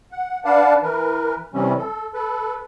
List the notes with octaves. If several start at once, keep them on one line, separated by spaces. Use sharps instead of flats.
F#5
D4 B4 D5 F5 F#5 A5
E3 A#4 B4
C3 E3 G3 C4 C#4
A4
A4 B4